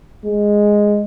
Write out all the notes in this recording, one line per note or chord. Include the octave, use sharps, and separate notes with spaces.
G#3